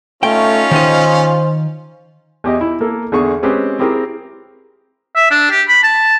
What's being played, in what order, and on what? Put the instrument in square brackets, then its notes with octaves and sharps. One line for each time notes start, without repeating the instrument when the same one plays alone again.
[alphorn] A3 [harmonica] C#4 D#4 F4 [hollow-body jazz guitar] G5
[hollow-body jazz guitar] D#3 D#5 [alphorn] C5
[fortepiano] E2 G4 D#5
E4
A#3 A4
E2 D3 G#4 C#6
G#3 C4 C#4 G4 G#4 B4
C4 E4 G4 G#4 A#4
[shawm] E5
D4
G4
B5
A5